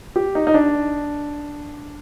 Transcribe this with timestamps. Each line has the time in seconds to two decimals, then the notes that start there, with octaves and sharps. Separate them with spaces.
0.16 G4
0.35 D#4
0.47 D#4
0.54 D4